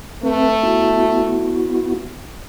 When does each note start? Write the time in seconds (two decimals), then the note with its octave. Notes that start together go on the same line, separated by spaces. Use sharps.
0.23 A3 C4 B4
0.63 B3 E4 F#4